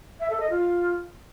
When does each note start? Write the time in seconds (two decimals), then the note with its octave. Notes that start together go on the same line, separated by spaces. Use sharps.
0.20 E5
0.30 A4
0.40 D#5
0.50 F4